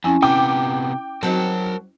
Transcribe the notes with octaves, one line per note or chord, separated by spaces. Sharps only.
F2 C#4 E4 G#5
C3 B3 G5 D6
F#3 C4 D#4 A#4 A5